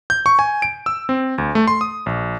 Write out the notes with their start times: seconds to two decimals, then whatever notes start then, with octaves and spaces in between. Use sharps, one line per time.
0.10 G6
0.26 C#6
0.39 G#5
0.62 D7
0.86 E6
1.09 C4
1.38 D2
1.55 A3
1.67 C6
1.81 D#6
2.06 A#1